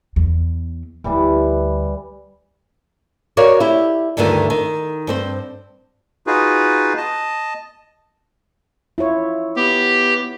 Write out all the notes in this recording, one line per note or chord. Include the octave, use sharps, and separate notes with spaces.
E2
D2 E3 G3 A3
F#4 A#4 C#5 D5 F5
E4 G4
D2 G2 D3 D#3 A3 F4
D#3
G2 C4 C5
D#4 F4 F#4 G#4 B4
D#5 A5
E4 F4 C#5
B3 G4